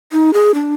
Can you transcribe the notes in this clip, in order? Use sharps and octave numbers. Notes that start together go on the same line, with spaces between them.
D#4
G#4
D4